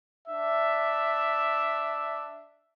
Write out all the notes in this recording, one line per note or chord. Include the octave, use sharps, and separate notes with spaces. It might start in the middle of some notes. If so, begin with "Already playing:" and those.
D4 E5